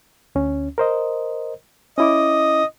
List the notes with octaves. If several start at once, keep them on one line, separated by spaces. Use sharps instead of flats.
D2 C#4
A#4 C5 D#5
C#4 E4 D#5 D6